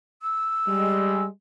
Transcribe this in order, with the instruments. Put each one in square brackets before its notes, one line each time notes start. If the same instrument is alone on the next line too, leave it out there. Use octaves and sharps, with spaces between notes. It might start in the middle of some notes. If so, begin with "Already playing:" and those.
[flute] E6
[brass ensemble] G3 G#3